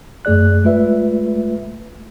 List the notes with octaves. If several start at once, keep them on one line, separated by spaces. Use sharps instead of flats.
F#2 A3 G#4 D5 F#6
G#3 A3 F4 B4 E5